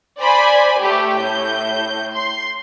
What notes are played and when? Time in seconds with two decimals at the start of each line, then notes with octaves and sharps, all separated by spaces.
0.20 C5 D5 G#5 B5
0.80 A3 G4
1.18 A2 G6
2.15 C6